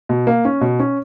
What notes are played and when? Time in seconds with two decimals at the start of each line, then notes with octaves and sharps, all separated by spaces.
0.09 B2
0.27 A#3
0.45 C#4
0.61 B2
0.80 C#4